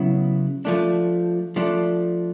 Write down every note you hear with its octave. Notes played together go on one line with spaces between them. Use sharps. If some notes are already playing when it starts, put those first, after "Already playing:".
Already playing: C#3 F#3 B3 E4
F3 A3 D4
F3 A3 D4